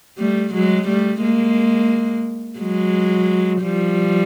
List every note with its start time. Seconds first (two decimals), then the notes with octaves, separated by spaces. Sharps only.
0.18 G3 A3
0.54 F#3 G#3
0.88 G3 A3
1.22 G#3 A#3
2.59 F#3 G#3
3.62 F3 G3